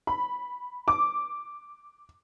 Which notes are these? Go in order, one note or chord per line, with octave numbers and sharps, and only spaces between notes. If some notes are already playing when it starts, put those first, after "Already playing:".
B5
D6